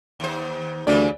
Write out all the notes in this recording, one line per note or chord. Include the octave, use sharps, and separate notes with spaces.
D#2 C5
D2 C#3 E3 G3 D5